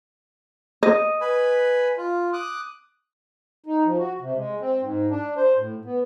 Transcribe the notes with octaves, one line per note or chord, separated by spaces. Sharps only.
D#5
B4 G#5 B5
F4
D6 D#6 F#6
D#4
F3
F#4
C3
G#3
C4
G#2
D4
C5
A2
B3